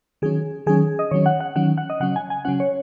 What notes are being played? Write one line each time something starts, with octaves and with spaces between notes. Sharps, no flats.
D#3 F#3 C#4 G#4
D#3 F#3 C#4 G#4
D#5
D#3 F#3 C#4 C#5
F#5
F#5
D#3 F#3 C#4 F#5
F#5
D#5
C#3 F#3 C#4 F#5
G#5
G#5
C#3 F#3 C#4 F#5
C#5